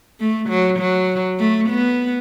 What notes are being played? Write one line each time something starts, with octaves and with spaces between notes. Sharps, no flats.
A3
F#3
F#3
A3
B3